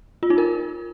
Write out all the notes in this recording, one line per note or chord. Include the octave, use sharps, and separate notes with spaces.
F4
D#4
A#4